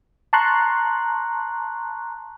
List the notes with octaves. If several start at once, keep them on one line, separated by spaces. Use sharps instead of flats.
A5 A#5 C6 C#6 F#6